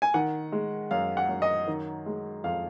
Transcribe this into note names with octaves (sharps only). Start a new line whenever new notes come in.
G#5
D#3 F#5
G#3
F#2 F5
F#5
F#2
D#5
D#3
G#3
F2 F5